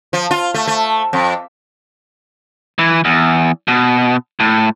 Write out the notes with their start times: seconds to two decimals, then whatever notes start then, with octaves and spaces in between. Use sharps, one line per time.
0.13 F3
0.31 F4
0.54 A3
0.67 A3
1.13 F2
2.79 E3
3.05 E2
3.68 B2
4.40 A2